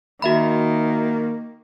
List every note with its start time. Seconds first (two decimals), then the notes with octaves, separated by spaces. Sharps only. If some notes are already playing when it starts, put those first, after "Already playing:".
0.22 D#3 A#3 F#4 E5 B5